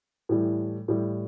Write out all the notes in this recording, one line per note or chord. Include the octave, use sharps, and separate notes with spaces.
A2 E3 G3
A2 E3 G3